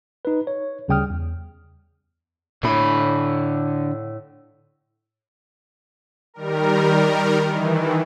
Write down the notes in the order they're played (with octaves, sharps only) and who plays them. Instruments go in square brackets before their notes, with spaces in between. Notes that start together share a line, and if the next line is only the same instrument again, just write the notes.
[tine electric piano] D#4 B4
C#5
D2 C#3 G3 G5 D#6 F6
E2
[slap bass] A2 [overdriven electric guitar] D3 B5
[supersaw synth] D#3 G3 A#4
D#3 E3